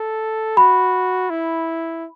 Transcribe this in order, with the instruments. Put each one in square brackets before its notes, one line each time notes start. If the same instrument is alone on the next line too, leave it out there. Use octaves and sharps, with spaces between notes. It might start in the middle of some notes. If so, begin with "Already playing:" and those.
Already playing: [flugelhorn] A4
[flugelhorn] F#4 [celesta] B5
[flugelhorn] E4